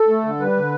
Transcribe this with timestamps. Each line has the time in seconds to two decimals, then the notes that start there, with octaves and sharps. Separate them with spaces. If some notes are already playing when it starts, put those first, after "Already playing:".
Already playing: A4
0.08 A3
0.24 D3
0.40 G3 B4
0.56 D3